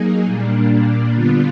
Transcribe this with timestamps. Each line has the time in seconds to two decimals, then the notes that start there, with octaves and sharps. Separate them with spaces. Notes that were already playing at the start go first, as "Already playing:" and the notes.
Already playing: F#3 A#3 D#4 G#4
0.25 A#2 G3 A#3 D4
1.13 D3 G3 B3 D4 F4